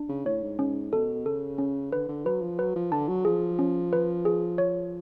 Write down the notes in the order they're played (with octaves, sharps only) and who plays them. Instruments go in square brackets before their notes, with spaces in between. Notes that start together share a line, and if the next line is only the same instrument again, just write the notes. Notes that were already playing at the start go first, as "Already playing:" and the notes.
Already playing: [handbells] D4
[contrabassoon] C#3
[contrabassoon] A2 [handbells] C#5
[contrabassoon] G#2
[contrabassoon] G#2 [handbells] C#4
[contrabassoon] B2 [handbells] A4
[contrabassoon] C#3 [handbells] A4
[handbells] C#4
[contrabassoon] D3 [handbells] B4
[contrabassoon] D3
[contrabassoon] F#3 [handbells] B4
[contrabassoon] F3
[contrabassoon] F#3 [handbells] B4
[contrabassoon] F3
[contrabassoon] D3 [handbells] A5
[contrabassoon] F#3
[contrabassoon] F3 [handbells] G#4
[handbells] C#4
B4
G#4
C#5